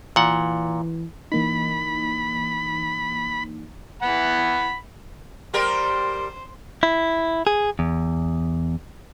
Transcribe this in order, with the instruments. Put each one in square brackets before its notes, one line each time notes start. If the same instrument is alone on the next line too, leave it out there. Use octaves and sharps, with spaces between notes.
[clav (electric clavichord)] A#2 F#5 [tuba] E3
[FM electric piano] E3 A#3 D#4 [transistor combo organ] B5
[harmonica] E3 F#5 B5
[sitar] G3 G4 A#4 [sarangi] C5
[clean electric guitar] E4
G#4
E2